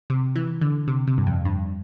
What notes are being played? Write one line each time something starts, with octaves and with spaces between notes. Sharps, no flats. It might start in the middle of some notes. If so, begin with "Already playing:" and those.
C3
E3
D3
C3
C3
G2
F2
G2